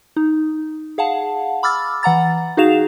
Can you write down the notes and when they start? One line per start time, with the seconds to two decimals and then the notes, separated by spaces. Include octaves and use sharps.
0.16 D#4
0.98 G#4 F5 F#5 A5
1.63 B5 D6 E6 F6 A6
2.03 E3 F#5 A#5 A6
2.57 D#4 F#4 G#4 F5 E7 F7